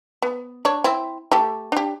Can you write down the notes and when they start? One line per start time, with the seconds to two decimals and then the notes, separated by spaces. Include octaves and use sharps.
0.22 B3
0.65 D4 C#5
0.84 C4 E4
1.32 A3 G4 A4
1.72 D4 G4